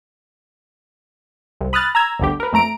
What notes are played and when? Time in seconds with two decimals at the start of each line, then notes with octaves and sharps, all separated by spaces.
1.61 C2
1.73 B5 D#6 F6 F#6 A6
1.95 A#5 E6 G#6
2.19 G1 D2 D3 G4
2.40 A#4 B4
2.53 F2 A3 A#5 D7